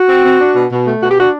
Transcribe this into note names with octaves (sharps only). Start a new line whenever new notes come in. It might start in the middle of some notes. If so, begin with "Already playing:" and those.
Already playing: F#4
C4
C4
D4
B2
B2
A3
B2 F#4
G4
D4 F#4